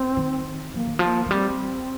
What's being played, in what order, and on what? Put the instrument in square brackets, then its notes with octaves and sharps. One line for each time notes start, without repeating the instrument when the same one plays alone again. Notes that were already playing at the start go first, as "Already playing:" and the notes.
Already playing: [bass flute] C4
[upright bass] D#3
[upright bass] F3 [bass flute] A#3
[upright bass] D#3
[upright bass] F3 [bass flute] A#3
[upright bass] F3
[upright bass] G3 [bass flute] C4